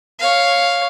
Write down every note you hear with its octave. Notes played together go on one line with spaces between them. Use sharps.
C#5 F5